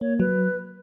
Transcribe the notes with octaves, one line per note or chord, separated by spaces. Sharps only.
A#3 C#5
F#3 B4